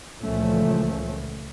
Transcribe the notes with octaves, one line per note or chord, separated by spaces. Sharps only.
C#2 A#2 E3 F3 A3 C#4